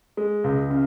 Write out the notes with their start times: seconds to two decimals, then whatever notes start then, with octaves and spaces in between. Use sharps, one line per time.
0.17 G#3
0.44 C#2
0.71 C#3